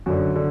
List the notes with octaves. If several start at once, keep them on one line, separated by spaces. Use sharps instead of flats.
F#2 D3 F#4
D3